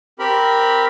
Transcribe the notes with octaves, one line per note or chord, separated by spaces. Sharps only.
C4 G4 A#4 B5